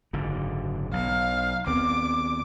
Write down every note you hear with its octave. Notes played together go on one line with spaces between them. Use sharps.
F#1 G#2 D3
B1 F5
D#2 B3 C4 D6